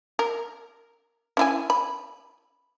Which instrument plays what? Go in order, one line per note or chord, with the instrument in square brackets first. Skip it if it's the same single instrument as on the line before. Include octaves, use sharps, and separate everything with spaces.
[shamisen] A#4
C#4 E4 G#5
B5